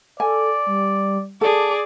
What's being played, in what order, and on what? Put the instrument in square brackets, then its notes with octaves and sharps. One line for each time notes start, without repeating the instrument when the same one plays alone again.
[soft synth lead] A4 [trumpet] D5 [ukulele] G#5
[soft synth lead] G3
[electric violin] G#4 D5 [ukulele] A4 [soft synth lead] D6